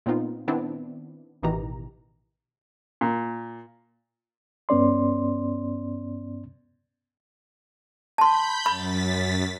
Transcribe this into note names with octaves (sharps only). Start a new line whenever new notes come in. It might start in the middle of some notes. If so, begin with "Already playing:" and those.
A#2 B3 C4 D#4 F4
D#3 B3 C4 D4 E4
A1 B2 D#3 E3 G4 A#5
A#2
G2 B3 C#4 D5 C6
A5 B5 C6 G6
F#2 B5 A6 B6